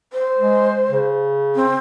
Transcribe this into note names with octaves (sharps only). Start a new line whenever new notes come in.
C5
G#3
C#3
C4